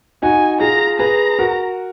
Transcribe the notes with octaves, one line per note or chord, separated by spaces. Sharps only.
D#4 F#4 G#5
F4 G#4 A#5
G#4 B4 A#5
F#4 A#4